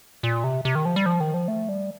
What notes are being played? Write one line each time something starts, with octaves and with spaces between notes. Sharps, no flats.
A#2
C3
C3
D#3
F3
G3
F3
D#3
F3
A3
G3